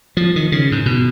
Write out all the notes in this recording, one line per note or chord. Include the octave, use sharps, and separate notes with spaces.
F3
D#3
C#3
G#2
B2